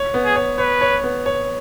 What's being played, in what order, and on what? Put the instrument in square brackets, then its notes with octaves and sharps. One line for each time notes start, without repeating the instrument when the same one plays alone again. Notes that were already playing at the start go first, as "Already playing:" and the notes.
Already playing: [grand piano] C#5
B3
[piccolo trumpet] G#4
[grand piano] C#5
[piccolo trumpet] B4 [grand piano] C#5
[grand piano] C#5
B3
C#5